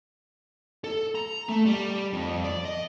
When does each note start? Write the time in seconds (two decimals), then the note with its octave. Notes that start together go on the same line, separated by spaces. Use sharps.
0.84 A4
1.15 A#5
1.49 A3
1.66 G3
2.13 F2
2.44 D5
2.65 D#5